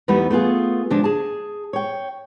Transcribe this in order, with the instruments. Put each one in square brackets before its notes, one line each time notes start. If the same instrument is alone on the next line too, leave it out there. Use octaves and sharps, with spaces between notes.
[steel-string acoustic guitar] E2 G3 A3 B3 D#4 B4
A3 B3 F4 G#4
D3 F3 G#3 D4
G#4 A5
C#5 G5